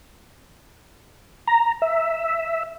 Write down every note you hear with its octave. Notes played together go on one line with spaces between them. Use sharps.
A#5
E5